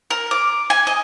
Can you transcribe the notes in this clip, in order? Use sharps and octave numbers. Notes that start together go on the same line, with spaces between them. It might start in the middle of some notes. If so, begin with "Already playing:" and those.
A#4
D6
G#5
D#5